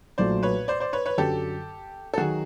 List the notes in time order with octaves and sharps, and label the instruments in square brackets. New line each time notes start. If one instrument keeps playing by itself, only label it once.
[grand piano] B1 A#2 F#3 A3 [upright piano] C5 D5
[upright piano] B4 C#5
C5 D5
C5 D5
B4 C#5
B4 C#5
[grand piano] F#2 D3 F#3 [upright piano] G4 A4
[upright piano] A4
[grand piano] D#3 F#3 [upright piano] F#4 G#4